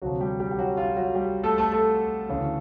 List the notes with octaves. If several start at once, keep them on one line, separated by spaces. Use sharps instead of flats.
D2 C3 F3 F#3 F#4
G3 G4
G3 G4
G4
F#3 F#4
F4
F#3 F#4
G3 G4
A3 A4
A3 A4
A3 A4
D2 C#3 E3